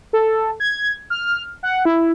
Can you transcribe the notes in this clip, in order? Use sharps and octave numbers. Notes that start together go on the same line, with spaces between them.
A4
G#6
F6
F#5
E4